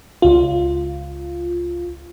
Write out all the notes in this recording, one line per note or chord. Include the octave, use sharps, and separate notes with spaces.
C#2 F4